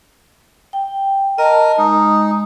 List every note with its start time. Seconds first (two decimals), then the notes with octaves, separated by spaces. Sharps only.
0.73 G5
1.38 A#4 D#5 A5
1.78 G#3 D#4